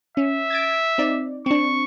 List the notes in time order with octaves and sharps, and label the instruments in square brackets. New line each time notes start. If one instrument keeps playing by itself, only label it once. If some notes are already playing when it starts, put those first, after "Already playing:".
[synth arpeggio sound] C#4 [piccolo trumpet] E5
[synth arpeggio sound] G#6 A6 D7
C4 D#4 D5
[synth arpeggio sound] C4 D4 [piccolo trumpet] C#6